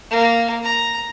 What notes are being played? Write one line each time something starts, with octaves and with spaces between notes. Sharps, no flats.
A#3
A#5